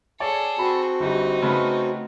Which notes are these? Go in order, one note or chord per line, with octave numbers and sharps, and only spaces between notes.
G#4 A4 C#5 D5
C4 F#4 B5
G1 G3 D#4
C#3 A3 B4